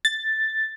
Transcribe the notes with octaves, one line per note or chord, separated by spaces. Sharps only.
A6